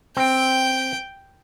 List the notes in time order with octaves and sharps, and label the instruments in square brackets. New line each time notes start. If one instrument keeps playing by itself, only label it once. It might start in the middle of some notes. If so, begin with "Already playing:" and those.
[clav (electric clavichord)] C4 [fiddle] G5